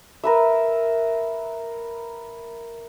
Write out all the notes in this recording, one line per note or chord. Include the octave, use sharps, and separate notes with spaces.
A#4 B4 E5